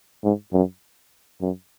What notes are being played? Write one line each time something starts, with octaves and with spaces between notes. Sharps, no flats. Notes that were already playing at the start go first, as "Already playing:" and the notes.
G#2
F#2
F#2